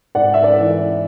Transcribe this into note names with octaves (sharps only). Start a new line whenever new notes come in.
G#2 D5 F#5
E5
D5
E3